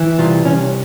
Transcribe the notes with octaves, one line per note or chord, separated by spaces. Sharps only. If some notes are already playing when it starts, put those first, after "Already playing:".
Already playing: E3
C2 F4
C2 C#4